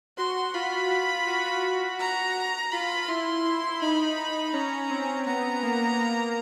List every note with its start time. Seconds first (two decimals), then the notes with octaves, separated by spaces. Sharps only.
0.17 F#4 C6
0.54 F4 B5
0.90 F4
1.27 F#4
1.99 A#5
2.72 F4 B5
3.08 E4 C6
3.45 E4
3.81 D#4 B5
4.53 C#4 A#5
4.90 C4
5.27 B3 A#5
5.63 A#3
5.99 A#3